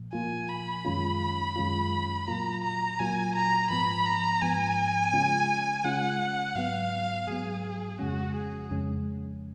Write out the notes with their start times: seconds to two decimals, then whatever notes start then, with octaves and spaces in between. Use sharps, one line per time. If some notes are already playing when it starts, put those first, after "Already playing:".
Already playing: A#2 F3
0.13 A#2 F3 A#3 F4 G#5
0.49 B5
0.85 F#2 D#3 G#3 C#4 F4
1.56 F#2 D#3 G#3 C#4 F4
2.27 A#2 F#3 A#3 F4 A#5
2.63 A#5
2.99 A#2 F#3 A#3 F4 G#5
3.35 A#5
3.70 G#2 F3 B3 B5
4.06 A#5
4.42 G#2 F3 B3 G#5
5.13 C#3 G#3 C#4 F4
5.84 C#3 G#3 C#4 F4 F#5
6.55 G#2 F#3 B3 F5
7.27 G#2 F#3 B3 G#4
7.99 F2 C#3 G#3 C#4 F#4
8.35 G#4
8.71 F2 C#3 G#3 C#4